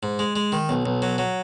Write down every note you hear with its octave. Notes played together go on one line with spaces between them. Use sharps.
G#2
G#3
G#3
D#3
B1
B1
F#3
F#3